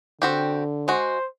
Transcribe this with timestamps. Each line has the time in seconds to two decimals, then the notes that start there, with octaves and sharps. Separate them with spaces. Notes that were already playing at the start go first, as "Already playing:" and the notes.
0.22 D3 C4 F#4 G4
0.88 G#3 F#4 C5